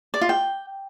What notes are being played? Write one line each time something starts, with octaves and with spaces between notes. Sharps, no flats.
D5
F4
G5